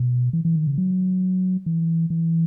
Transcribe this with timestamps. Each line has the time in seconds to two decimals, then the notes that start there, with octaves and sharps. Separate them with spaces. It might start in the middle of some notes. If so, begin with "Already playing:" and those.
Already playing: B2
0.33 E3
0.45 E3
0.56 D#3
0.67 C#3
0.78 F#3
1.66 E3
2.10 E3